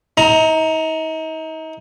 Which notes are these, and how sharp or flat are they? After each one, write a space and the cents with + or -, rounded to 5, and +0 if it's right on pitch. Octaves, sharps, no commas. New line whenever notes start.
D#4 +40 A#5 +0